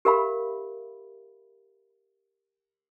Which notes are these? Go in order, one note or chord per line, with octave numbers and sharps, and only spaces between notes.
G4 A#4 E5 F5 B5